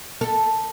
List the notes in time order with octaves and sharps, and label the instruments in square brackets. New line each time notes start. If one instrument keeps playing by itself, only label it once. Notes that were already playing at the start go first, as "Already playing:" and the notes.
[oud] A4